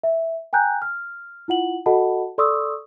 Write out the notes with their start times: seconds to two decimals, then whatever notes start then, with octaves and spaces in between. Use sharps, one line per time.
0.03 E5
0.53 G5 G#5 A#5 F#6 G6
0.82 F6
1.48 E4 F4 F#5 F#7
1.86 F#4 A4 D#5 F#5 A5 B5
2.38 A4 D5 C6 C#6 D#6 E6